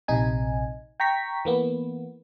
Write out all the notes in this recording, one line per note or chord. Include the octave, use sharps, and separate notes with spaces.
A#1 C3 D#4 G#5
G5 A#5 C#6 B6
E3 A#3 B3